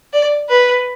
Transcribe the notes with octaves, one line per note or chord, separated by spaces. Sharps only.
D5
B4